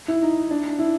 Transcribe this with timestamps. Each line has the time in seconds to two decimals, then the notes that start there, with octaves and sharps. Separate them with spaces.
0.08 E4
0.22 D#4
0.51 D4
0.79 E4